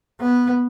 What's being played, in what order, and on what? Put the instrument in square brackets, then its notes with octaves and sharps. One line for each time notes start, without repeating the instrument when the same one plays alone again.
[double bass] B3